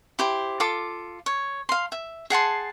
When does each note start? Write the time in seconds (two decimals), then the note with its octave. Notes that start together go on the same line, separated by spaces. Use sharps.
0.19 E4 G4 C5
0.60 F4 A4 D6
1.26 C#5
1.69 F5 C6
1.92 E5
2.30 G#4 F#5 A5 C6